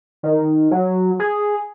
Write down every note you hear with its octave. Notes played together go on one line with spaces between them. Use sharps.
D#3
F#3
G#4